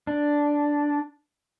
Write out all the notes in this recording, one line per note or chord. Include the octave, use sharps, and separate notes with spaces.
D4